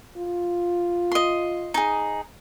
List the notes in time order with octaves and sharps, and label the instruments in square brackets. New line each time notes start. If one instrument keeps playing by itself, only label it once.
[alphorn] F4
[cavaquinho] D#5 C6
D#4 G#4